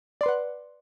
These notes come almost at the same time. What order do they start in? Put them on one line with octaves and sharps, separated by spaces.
D5 C6 B4 F#5